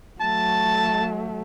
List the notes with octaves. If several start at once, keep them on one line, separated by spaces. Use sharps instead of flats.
F#3 A3 A5